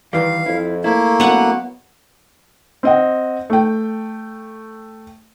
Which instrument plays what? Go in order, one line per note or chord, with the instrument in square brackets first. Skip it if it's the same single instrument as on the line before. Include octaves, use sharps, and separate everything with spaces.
[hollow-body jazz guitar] D#3 E3 G3 [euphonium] B4 [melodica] F5
[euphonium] F2 [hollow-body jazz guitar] E4
[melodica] A3 A#3 [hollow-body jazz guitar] E4
[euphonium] F#2 [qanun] B3 F#5
[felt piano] C4 D#5 F#5
A3 G5